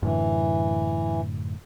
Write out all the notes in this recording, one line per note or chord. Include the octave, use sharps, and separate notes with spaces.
F#2 A2 D3 E3